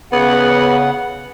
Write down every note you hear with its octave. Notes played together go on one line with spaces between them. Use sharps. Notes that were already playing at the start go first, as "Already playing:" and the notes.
C#3 B3 F#5